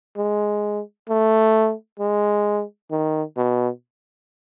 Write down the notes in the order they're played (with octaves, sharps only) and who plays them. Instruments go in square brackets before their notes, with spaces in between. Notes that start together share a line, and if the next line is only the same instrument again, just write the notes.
[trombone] G#3
A3
G#3
D#3
B2